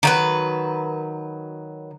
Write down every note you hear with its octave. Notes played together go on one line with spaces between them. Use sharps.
D#3 F#3 B4